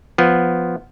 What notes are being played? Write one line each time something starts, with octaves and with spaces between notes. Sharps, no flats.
F3 B3